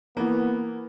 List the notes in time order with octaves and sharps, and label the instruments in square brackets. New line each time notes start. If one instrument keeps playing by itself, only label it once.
[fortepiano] E3 A#3 [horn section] B3